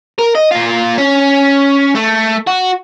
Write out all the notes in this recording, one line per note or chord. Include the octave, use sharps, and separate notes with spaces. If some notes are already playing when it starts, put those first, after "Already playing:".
A#4
D#5
A#2 F4
C#4
A3
F#4